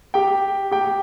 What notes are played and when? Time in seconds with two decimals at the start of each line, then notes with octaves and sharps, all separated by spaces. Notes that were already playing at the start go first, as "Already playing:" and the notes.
0.14 G4 G5
0.71 G4 G5